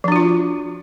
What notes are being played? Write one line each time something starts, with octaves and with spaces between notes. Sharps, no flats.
F3 D4 F4 F#4